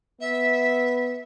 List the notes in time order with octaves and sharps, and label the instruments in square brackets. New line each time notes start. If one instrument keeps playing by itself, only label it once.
[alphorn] B3 [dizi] E5